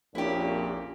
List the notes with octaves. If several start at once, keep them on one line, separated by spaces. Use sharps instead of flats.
A#1 F2 A#2 C#4 E4 G4